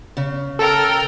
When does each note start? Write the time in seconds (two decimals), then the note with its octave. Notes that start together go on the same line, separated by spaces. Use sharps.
0.17 C#3
0.59 A4 A#4 G5